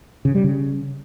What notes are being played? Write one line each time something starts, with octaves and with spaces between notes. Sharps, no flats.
C#3
G3
C#3